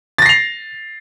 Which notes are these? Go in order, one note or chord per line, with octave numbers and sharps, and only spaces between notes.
A6 A#6 C7 F7